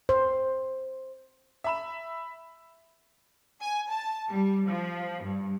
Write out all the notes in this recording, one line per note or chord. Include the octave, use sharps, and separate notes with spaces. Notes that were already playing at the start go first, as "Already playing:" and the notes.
C5
E5 B5 E7
G#5
A5
G3
F3
G2